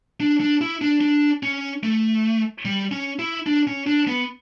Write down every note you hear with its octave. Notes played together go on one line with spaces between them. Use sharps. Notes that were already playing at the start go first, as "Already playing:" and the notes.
D4
D4
E4
D4
D4
C#4
A3
G3
C#4
E4
D4
C#4
D4
B3